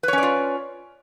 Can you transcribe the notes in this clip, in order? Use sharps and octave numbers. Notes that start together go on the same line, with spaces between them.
C#4 F4 B4 C#5 D5